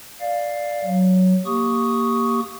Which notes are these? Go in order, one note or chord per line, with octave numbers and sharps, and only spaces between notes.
D5 F5
F#3
A#3 G4 C#6 D#6